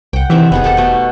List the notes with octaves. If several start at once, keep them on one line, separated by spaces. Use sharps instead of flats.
C2 F#5 G5
C3 D#3 E3 E5
F1 B3 D#4 G#4
E1 G4 A4 F#5
B2 A3